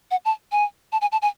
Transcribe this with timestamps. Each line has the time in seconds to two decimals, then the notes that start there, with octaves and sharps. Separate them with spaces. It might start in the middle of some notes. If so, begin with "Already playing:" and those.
0.11 F#5
0.25 A5
0.52 G#5
0.92 A5
1.01 G#5
1.12 A5
1.22 G#5